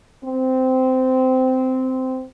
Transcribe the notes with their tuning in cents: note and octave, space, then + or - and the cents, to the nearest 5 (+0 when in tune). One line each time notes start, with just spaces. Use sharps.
C4 -15